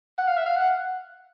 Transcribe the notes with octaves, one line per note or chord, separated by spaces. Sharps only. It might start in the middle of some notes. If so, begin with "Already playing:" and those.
F#5
F5
E5
F5
F#5